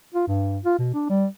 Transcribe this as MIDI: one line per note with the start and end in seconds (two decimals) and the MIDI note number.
0.14 0.26 65
0.28 0.59 43
0.65 0.75 65
0.79 0.91 47
0.94 1.09 62
1.09 1.26 55